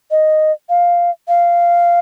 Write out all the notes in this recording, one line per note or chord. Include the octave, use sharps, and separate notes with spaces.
D#5
F5
F5